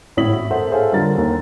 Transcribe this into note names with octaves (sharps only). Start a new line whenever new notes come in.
G#1 A2 E4 D#6 B6 F#7
F#4
A4 A#4 C5 E5 F#5
G#4 A4 C5 C#5 F5 G#5
D3 G3 F4 A#4 A6
D#2 D#3 A#3